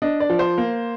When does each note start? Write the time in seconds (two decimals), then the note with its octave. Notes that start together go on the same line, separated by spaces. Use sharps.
0.02 D4 D#5
0.20 D5
0.30 F3
0.39 C5
0.58 A#3